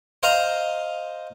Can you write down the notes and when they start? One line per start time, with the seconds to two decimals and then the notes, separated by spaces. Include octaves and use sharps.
0.23 C5 D#5 F5 A#5